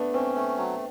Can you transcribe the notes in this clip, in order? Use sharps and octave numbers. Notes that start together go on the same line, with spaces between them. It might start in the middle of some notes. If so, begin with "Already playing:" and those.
Already playing: A3 B3 D4
C4 C#4
A3
F#3